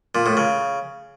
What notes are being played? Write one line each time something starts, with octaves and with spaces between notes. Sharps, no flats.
A#2
A2
C#3